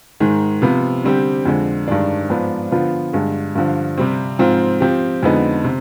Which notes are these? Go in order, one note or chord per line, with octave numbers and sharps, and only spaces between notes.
G#2 D#3 G#3
C3 F3 B3
D3 G3 C4 G4
F2 D3 G#3
G2 D#3 G#3 D4
G#2 F3 B3 D4
D3 F3 B3 F4
G2 D3 G#3
G2 D3 F3
C3 G3 C4
G#2 F3 C4 F4
F3 C4 G4
F2 D3 G#3 B3 D#4
C3